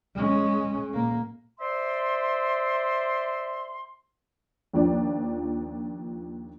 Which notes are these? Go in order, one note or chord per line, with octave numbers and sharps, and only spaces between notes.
G#3 C#4
A#2 A#3
C5 D5 E5 C6
D#2 F3 D4